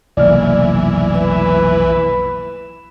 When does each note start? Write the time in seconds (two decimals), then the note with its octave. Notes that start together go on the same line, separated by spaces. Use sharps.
0.17 F1 B1 E3 A#3 D5 F6
1.14 B4 E7